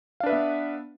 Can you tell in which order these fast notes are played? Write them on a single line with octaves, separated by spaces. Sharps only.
F5 D4 B4 E5 B3